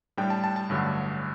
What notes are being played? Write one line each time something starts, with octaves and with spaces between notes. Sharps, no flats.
A2 G3 D4 G5
A5
A5
A5
A1 G2 D3 F#3 A3